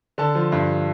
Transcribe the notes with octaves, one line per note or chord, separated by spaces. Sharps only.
D3 A5
F3
G2